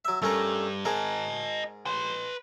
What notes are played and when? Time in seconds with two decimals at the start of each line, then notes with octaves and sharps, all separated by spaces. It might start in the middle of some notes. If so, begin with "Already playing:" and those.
0.05 F#3 E5
0.22 G2 G3 A3 C#4 A#4
0.85 G#2 G#4 A#4 D#5 A5
1.86 B4 C6